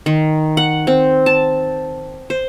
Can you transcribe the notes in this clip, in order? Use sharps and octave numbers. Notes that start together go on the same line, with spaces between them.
D#3
F#5
C4
A5
C5